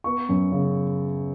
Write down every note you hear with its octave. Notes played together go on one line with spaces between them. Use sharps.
B3 C#6
F#2
C#3